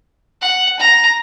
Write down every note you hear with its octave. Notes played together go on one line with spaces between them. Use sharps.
F#5
A#5